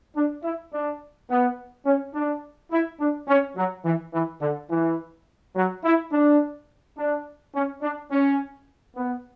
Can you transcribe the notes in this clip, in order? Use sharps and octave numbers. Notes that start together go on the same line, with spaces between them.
D4
E4
D4
B3
C#4
D4
E4
D4
C#4
F#3
E3
E3
D3
E3
F#3
E4
D4
D4
C#4
D4
C#4
B3